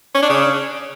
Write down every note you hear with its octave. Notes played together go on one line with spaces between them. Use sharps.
C#4
D4
C#3